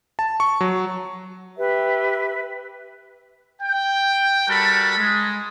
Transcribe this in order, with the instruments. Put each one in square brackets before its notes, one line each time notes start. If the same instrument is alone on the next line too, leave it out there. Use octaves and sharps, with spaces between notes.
[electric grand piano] A5
C#6
F#3
[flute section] G4 B4 E5
[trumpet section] G5
G3 F#4 A4 A#4 A5 B5
G#3